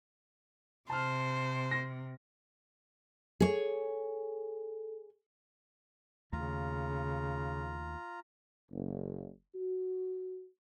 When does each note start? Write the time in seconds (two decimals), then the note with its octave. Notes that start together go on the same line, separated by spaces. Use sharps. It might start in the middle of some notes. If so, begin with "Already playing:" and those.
0.90 C3 C5 A5 F6
1.71 A#6
3.40 G#4 A4 C#5
6.33 D#2 C#3 A3 F4 A#5
8.71 F#1
9.54 F#4